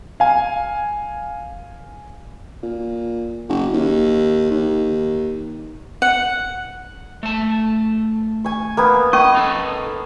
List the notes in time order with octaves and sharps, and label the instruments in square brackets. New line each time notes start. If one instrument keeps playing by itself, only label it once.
[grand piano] F5 G#5
[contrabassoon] A#2
F#1
D#2
D#2
[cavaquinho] F#5
[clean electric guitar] A3 A5
[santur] G#5 C#6
A#3 B3 G#5
[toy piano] C#4 C#6 [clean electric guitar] D#5
[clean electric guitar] D#4 A4